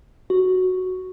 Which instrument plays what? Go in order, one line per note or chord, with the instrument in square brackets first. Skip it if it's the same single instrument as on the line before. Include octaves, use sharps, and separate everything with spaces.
[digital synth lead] F#4